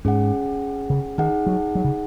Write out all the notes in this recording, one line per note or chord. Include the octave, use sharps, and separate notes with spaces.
G#2 C#4 G#4 F#5
C#3
D#3 D#4 G#4 F#5
F#3
F#3
C#3